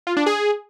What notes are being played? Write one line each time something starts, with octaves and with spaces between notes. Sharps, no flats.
F4
D4
G#4